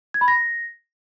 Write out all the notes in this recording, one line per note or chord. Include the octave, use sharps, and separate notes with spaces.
G#6
B5
A#6